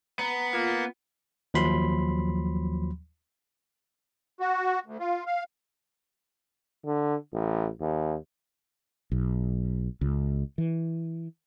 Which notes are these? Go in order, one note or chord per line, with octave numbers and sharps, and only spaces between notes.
B3 A#5
A#3 F4
D#2 F3 F#3 B5 C6
F#4
D2
F4
F5
D3
A1
D#2
B1
C#2
E3